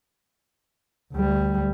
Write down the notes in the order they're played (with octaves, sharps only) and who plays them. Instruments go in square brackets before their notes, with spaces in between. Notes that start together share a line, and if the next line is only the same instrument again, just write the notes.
[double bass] D2 G3